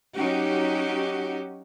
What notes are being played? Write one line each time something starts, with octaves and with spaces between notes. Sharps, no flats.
F#3 C#4 D#4 F#4 G4